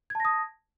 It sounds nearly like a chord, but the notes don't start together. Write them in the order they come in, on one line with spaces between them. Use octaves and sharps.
G#6 A5 A#6 D#6